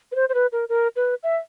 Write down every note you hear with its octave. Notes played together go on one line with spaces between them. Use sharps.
B4
C5
C5
B4
A#4
A#4
B4
E5